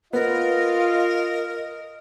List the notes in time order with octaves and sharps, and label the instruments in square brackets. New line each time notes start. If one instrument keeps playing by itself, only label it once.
[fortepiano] B3 [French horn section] F4 [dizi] A#4 [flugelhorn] D#5